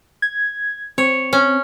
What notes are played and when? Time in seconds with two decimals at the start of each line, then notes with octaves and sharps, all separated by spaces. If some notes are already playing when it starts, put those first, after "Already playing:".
0.22 G#6
0.98 C4 C#5
1.33 C#4